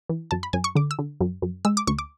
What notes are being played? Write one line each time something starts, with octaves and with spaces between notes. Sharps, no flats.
E3
F#2 A5
B5
F#2 G#5
C#6
D3 D6
E6
D3
F#2
F#2
G#3 E6
D6
D2 C#6
D6